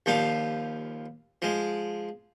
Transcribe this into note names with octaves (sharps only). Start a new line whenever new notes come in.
D#2 F3 G3 F5
F3 G#3